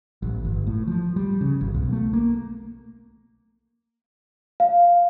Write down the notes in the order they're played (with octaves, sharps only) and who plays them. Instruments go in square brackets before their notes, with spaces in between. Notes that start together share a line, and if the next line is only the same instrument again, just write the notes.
[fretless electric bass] A1
G1
A2
F3
G3
C#3
G#1
B1
A3
A#3
[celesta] F5